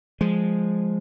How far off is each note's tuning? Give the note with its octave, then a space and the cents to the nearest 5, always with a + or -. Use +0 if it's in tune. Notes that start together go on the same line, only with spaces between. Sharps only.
F3 +0 G#3 -5